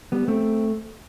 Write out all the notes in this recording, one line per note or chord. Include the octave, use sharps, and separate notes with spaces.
G3 B3
A3 C4